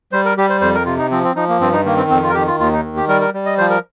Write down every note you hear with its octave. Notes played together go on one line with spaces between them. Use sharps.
G3 C5
A#4
G3 G4
C5
F2 C5
A#4
C3 F4
D#4
F3 C4
C4
F3 D#4
A#3
G2 C4
D#4
D#3 A#3
C4
F2 C4
F4
A#4
D#3 G4
F4
D#2 F4
D#4
D#3
G4
G3 A#4
A#4
G3
D#5
F3 C5
A#4